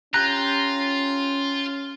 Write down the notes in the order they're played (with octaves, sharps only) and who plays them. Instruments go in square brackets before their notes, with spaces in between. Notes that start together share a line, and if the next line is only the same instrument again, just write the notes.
[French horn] C#4 [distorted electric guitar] F4 [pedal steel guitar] G4 A#5 [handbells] F#6